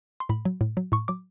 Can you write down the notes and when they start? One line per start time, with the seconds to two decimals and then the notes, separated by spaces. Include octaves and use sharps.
0.20 C6
0.29 A2 B5
0.45 F#3
0.61 A2
0.77 F#3
0.92 A2 C#6
1.08 F#3 D6